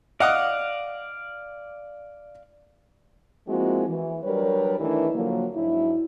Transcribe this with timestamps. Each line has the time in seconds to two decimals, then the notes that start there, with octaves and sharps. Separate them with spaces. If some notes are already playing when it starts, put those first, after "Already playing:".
0.20 D5 D#5 F5 F#5 D#6
3.47 F3 G#3 A#3 C4 E4 F#4
3.87 E3
4.24 F#3 G3 D4 A#4 B4 C#5
4.79 D#3 E3 A3 D4 E4 A#4
5.14 D3 F3 F#3 A#3
5.55 G#2 F#3 D4 E4